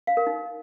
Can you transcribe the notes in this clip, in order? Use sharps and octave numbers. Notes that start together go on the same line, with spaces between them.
F5
A#4
D#4